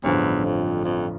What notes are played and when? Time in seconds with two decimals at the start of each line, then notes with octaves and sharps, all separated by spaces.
0.04 A1 E2 G2 D3 F3
0.44 F2
0.84 F2